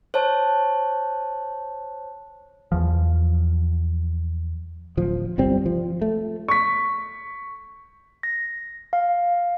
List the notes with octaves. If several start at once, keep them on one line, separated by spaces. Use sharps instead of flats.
C5 C#5 A5
E2 F3
D1 F3
G1 C2 G3 C4
F3
A3
C#6 B6
A#6
F5